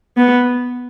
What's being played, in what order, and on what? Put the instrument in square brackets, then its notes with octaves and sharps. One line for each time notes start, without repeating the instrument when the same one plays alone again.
[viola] B3